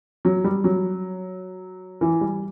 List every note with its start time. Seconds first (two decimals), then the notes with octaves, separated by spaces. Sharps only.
0.25 F#3
0.44 G3
0.64 F#3
2.01 E3
2.21 G3